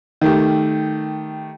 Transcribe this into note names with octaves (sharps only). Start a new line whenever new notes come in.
D#3 A3 G4